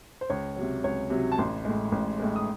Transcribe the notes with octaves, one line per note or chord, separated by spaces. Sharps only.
C5
C#2 C#5
C3 F#3
C#2 C#5
C3 F#3
A5
A1 C6
A2 G#3
A1
A2 G#3
D#6